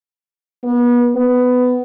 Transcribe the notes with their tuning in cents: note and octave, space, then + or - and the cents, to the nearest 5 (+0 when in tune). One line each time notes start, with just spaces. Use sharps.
B3 -30
B3 +15